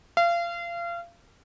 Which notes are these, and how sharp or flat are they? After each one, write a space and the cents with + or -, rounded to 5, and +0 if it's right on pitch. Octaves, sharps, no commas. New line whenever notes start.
F5 -30